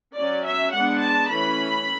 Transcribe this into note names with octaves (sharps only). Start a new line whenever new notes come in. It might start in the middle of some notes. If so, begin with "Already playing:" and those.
F#3 C#4 D5
E5
G#3 B3 D4 F#5
A5
E3 A3 C#4 B5